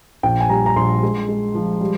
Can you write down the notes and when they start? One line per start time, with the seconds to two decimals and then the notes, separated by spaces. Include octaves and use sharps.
0.23 A#1 G5
0.40 G#5
0.49 G3 A#5
0.66 A#5
0.76 A#1 C6
1.03 G#3
1.29 G#3
1.55 F3
1.81 G3